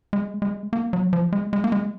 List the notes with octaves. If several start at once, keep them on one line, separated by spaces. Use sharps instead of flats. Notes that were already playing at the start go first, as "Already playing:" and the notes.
G#3
G#3
A#3
F#3
F3
G#3
G#3
A#3
G#3